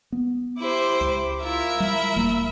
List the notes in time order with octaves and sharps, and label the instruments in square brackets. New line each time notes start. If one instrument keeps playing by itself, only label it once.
[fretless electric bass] B3
[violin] E4 C5 [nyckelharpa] G4 D6
[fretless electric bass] C#2
[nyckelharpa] E4 F4 [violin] A#4 E5
[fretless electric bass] G3 [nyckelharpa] B5
[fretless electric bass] D#1 G3 A#3